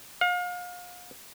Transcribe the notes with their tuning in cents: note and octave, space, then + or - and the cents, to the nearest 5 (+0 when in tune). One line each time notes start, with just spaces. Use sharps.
F5 +35